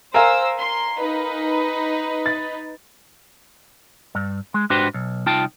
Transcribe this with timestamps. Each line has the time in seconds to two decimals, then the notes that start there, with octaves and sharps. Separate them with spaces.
0.14 A#4 C5 F5 G#5 E6
0.59 C6
0.99 D#4 B4
2.26 A6
4.15 G2
4.54 G#3
4.70 G#2 D4 F#4 G4 B4 C5
4.94 B1
5.26 C2 D#4 F4 G5 A5